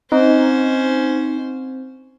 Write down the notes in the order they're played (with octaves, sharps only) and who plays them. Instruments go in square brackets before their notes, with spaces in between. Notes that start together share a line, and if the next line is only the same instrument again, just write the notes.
[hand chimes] C4 [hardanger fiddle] C#4 C5 [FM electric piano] D#4